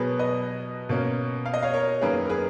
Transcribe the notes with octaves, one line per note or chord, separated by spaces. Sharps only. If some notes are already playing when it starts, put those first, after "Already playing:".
Already playing: B2 F#3 B3 G#4 A#4 B4 C#5
B4 D#5
B2 A#3 C#4
F5
D#5
C#5 F5
A#4 C#5
F#2 D#3 A#3 C#4 G#4 B4
A#4
G#4 B4